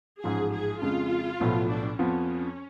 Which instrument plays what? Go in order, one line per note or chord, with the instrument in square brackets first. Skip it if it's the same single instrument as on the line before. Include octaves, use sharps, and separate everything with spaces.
[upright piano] A1 G#2 F3 [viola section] G#4
[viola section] G#4
[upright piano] F2 C#3 G#3 [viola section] F4
[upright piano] B1 A2 F3 B3
[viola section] D4
[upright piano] F2 F3 B3 [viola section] C#4